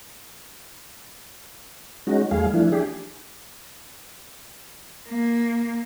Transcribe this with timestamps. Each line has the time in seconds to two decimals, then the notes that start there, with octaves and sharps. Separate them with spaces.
2.07 G#3 C#4 D#4 F#4
2.31 E2 G3 A3 G#4 F5
2.53 E3 F3 A3 D4 E4
2.72 D4 G4 G#4
5.08 A#3